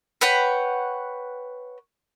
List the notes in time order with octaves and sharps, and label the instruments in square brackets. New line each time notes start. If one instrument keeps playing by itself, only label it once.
[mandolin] B4 C#5 F#5 G5